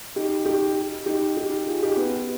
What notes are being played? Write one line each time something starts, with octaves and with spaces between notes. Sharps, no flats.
D#4 G4
D#4 G4
D#4 G4
D#4 G4
F4 G#4
D#4 G4
B3